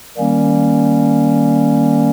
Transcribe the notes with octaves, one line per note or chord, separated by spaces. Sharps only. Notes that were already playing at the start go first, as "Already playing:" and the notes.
D#3 G3 A#3 C#4